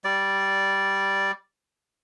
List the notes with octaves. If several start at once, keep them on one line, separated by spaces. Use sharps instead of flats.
G3 D5